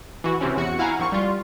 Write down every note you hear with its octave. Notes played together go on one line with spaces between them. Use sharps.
E3 F#4
C3 E3 C4 C#4
E2 F#4 C#7
E4 F5 F#5 G#5 A#5
A#1 C4 C#6
G3 F4